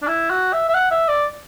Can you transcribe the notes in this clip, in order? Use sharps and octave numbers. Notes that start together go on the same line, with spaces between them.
D4
E4
F#4
E5
E5
F#5
E5
D5